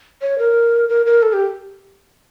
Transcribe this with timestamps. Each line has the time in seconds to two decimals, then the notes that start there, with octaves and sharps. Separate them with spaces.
0.22 C#5
0.38 A#4
0.89 A#4
1.06 A#4
1.23 A4
1.33 G4